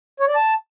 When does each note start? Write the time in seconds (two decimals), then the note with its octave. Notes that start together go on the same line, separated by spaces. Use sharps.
0.20 C#5
0.28 D5
0.36 A5